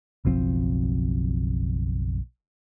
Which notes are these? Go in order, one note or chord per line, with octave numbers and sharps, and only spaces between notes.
F#1 B1 F3 C4